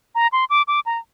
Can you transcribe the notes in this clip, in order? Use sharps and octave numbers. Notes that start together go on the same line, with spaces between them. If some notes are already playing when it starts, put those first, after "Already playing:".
A#5
C6
D6
D6
A#5